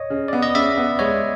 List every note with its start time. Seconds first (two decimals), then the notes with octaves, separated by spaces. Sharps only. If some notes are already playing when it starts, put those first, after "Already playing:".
Already playing: C#5 D#5
0.10 C#3
0.28 B3 D5
0.42 D#5
0.54 C#3 D5 E5
0.77 B3
0.99 G#3 C#5 D#5